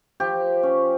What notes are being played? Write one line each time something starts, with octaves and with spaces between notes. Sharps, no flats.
F3 G4
C#4